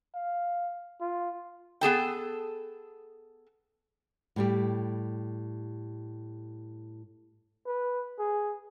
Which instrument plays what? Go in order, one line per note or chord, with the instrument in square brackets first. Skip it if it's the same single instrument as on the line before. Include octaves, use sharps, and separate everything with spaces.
[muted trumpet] F5
F4
[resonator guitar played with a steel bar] B3 G#4 A4 G5
[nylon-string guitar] A2 G3 G4
[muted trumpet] B4
G#4